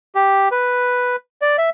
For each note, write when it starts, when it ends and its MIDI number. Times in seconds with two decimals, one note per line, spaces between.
0.15 0.49 67
0.51 1.16 71
1.42 1.57 74
1.58 1.70 76